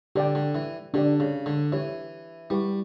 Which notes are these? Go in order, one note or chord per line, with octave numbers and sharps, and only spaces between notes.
D3 G4 D5 G5
D3
E3
D3 D4 G4 D5
C#3
D3
E3 G4 C#5 E5
G3 E4 B4 F#5 C#6